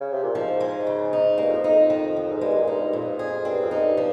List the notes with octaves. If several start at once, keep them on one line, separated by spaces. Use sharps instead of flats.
C#3
C3
A#2
G#2 F3
G#3
C#3
D#4
G2 A#3
F2
D#4
F2
D#3
D#3
G#2
G2 G#3
A#2
G2 D#4
G2
F2 A#2
G#4
G2 C4
F2
D#4
G2
F3